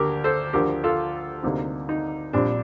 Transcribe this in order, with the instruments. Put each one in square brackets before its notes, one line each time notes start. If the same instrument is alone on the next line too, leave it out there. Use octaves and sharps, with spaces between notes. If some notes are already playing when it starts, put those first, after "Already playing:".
Already playing: [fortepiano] D2 D3 A#3 G4 A#4
A4 C5
D2 D3 F3 G4 A#4
F4 A4
D2 C3 G3 A#3 D#4
D#4
A#1 A#2 G3 C4 D4